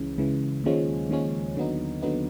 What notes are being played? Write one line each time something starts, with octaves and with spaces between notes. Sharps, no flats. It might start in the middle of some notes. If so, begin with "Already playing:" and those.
Already playing: C#2 C#3 E3
C#2 C#3 E3
D#2 C#3 F3 G#3 C#4
D#2 C#3 F3 G#3 C#4
D#2 D3 F#3 B3 D#4
D#2 D3 F#3 B3 D#4